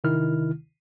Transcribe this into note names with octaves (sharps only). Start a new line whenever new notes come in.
C3 D#3 E4 F6